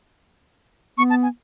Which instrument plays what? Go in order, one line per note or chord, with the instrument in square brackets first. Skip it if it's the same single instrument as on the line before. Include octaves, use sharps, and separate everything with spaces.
[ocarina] B3 [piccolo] C#6
[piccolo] A5
G#5